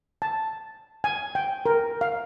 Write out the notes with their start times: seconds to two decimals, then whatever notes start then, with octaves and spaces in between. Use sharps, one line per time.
0.22 A5
1.04 G#5
1.35 G5
1.66 A#4
2.01 F5